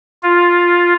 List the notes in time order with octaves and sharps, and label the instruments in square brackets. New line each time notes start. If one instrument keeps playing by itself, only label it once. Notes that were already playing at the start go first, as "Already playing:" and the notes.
[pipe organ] F4